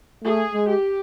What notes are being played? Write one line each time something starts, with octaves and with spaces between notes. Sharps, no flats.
A3 G#4
G#3
G4